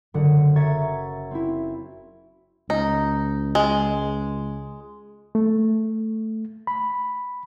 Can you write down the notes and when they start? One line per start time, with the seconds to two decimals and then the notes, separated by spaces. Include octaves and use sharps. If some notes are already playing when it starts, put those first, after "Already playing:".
0.14 F#1 D3 F#5
0.56 E5 A#5 C#6 G#6 A6 C#7
1.31 C4 E4
2.70 C#2 D#4
3.55 G#3
5.35 A3
6.67 B5